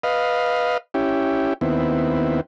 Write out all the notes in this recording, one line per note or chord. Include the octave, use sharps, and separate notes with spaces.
B4 D#5 F5
C#4 E4 G4
D#2 B3 C4 E4